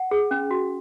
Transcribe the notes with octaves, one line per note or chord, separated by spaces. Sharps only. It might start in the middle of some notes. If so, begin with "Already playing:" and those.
Already playing: F#5
G#4
C#4
F#4